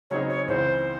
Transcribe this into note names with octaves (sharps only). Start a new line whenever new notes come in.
C#3 F#3 C4 D#4 G#4 C#5
C#5
C#2 C#3 E3 C4 C5